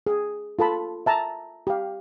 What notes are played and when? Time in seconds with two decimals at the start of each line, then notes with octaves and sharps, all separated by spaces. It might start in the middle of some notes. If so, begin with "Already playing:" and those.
0.07 G#4
0.59 F4 A4 A5 B5
1.06 E5 A5 A#5
1.67 G4 F5